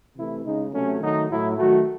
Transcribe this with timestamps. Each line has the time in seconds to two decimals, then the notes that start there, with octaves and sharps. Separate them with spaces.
0.16 C3 E3 A3 E4
0.44 C#3 G#3 D#4
0.72 C3 F#3 A3 C#4
1.01 D#3 F#3 A3 D#4
1.29 A2 F#3 A3 E4
1.57 D#3 F#3 A3 F#4